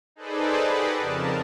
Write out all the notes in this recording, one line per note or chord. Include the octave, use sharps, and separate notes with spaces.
D#4 G#4 A4 B4 C5 D5
G4 G#4 B4 D5 D#5 F#5
F2 C#3 A#4 A5